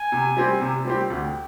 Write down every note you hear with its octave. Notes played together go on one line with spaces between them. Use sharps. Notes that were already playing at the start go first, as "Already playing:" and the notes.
Already playing: G#5
C3
G3 C4 G4
C3
G3 C4 G4
D2 G5